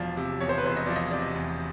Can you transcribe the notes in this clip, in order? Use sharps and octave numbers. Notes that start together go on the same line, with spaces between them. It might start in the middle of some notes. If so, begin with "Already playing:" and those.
Already playing: E1 F3 D5
C3
E2 C#5
C5
B4
E1 C5
D#5
F3 D5
D#5
C3 D5
E2